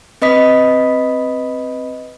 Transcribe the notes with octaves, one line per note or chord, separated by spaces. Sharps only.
C4 B4 D#5 B5 D#6 B6